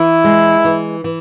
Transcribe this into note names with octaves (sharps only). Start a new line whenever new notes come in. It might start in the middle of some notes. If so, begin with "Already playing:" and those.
Already playing: E3 E4
G#3
E3
E3